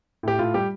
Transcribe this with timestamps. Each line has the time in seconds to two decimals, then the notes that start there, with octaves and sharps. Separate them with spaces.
0.23 A2 G4
0.39 A2 F4
0.54 G3 G4